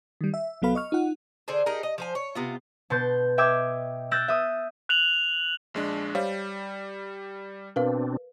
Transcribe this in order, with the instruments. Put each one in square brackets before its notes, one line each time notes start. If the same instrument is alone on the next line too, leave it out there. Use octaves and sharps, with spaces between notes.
[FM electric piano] D#3 G3
E5
C2 F#3 B3 A4 F5 B5
D#5 C#6 F6
D#4 F4 F#5
[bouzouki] D3 G#4 C5
D#4 G4 G#4 A#4
D#5
F3 C5 G#5
C#5
C3 B3 F4
[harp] B2 A5 C6 G6
D#5 E5 G5 D6 E6 G#6
E6 F#6 G6 A6 A#6 D7
E5 D#6
[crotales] F#6 F7 F#7
[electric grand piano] A#1 G#3 D4
[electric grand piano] G3 [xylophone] C5 C#5 F5
[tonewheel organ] B2 C4 D4 [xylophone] A#4 B4 F5